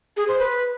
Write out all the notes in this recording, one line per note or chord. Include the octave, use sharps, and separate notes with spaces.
G#4
C5
B4